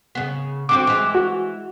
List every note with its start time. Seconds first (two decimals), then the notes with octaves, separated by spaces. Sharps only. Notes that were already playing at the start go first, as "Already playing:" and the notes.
0.15 C#3 B3
0.69 D3 C4 F#4 D6
0.87 E3 G#3
1.15 F#4